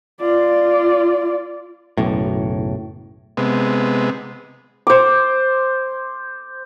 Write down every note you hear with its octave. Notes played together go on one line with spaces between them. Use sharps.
F4 D5
F#1 B1 A2
C3 G#3 B3
C5 D6